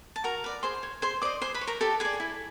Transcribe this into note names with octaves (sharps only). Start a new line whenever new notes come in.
A5
F#4 A#4 A#5
B4 D5
G#4 C5 C6
C#5
G#4 C5 C6
C5 D5 D#5 D6
G#4 C5 C6
B4 B5
C#5
A#4 A#5
G4 A4 A5
G#4 B4 D5 G#5
E4